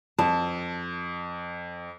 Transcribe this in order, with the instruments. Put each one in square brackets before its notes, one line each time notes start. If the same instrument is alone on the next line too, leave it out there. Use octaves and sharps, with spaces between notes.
[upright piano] F2 [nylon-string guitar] A5